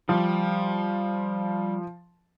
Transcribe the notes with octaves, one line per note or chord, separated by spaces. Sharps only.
F3 G3